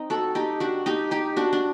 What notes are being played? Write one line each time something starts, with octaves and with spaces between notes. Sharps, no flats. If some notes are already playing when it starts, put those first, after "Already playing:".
Already playing: C4 D#4
F#4 A4
D#4 G4
D4 F#4
D#4 G4
D#4 G4
D4 F#4
D4